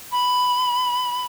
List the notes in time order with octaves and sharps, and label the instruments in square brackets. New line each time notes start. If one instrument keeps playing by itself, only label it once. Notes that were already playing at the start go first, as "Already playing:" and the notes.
[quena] B5